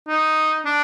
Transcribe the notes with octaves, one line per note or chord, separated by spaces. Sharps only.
D#4
D4